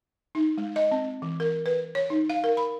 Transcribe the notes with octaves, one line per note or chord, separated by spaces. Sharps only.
D#4
G#3
D#5
C4
E3
A#4
B4
C#5
D#4
F5
A#4
B5